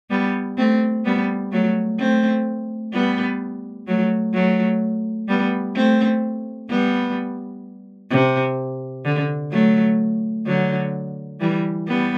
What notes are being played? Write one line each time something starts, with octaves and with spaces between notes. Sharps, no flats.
G3 B3
A3 C4
G3 B3
F#3 A3
A3 C4
G3 B3
F#3 A3
F#3 A3
G3 B3
A3 C4
G3 B3
C3
D3
F#3 A3
D3 F#3
E3 G3
G3 B3